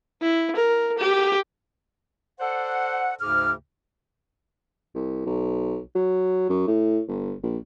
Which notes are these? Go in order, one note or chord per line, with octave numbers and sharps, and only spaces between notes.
E4
A#4
G4
A4 C5 D5 F#5
D2 G#2 C#3 G#4 D6 F6
C2
B1
F#3
F#2
A2
G1
A#1